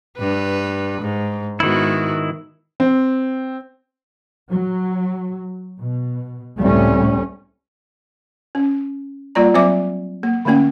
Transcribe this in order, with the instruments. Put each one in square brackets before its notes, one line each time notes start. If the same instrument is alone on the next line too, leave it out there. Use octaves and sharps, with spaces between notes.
[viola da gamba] G2 B4
G#2
[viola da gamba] G#2 B3 F#4 [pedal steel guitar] D#3 E4
[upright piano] C4
[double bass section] F#3
B2
C#2 A2 G3 A3 C4 C#4
[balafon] C#4
G3 A#3 F4 D5 A#5
F#3 C4 C5 D5 E5 D6
A#3
D3 A3 A#3 C#4 G5